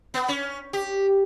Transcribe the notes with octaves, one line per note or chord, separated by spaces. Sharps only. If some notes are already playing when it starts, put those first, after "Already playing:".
B3
C#4
G4